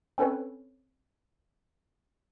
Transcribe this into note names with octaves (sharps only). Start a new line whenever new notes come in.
C4 C#4 A4 B4 C#5